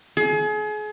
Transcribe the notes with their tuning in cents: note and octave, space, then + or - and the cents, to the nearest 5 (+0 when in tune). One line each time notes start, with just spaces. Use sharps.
G#4 +35